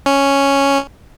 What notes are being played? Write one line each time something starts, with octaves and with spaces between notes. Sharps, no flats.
C#4